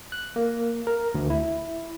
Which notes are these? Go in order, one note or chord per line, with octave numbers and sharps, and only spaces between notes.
F#6
A#3
A#4
D2
E4